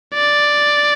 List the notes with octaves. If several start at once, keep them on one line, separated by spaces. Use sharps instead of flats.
D5